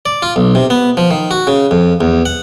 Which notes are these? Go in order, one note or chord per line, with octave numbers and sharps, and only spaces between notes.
D5
F4
B1
C3
B3
F3
D#3
F#4
C#3
F2
E2
F#5